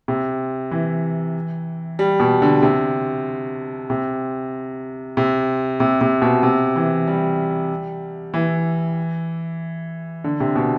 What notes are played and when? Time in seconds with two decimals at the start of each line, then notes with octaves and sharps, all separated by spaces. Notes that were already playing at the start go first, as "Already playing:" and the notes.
0.08 C3
0.71 E3
1.99 G3
2.20 B2
2.42 D3
2.63 C3
3.90 C3
5.17 C3
5.80 C3
6.01 C3
6.22 B2
6.43 C3
6.76 E3
7.08 G3
8.34 E3
10.24 D3
10.40 C3
10.56 B2